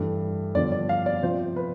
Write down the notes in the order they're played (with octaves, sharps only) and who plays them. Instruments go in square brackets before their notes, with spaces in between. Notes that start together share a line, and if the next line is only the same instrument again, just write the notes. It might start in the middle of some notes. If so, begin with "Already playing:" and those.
Already playing: [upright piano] G2 E3 A3
G2 D3 F3 B3 D4 D5
D5
F5
D5
C3 F3 C4 F4 C5
B4